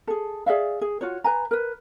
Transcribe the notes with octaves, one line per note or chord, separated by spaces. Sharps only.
G#4 A4
G#4 D5 E5 F5
G#4
F4 F#4 C#5
B4 G#5 A#5
A#4 B4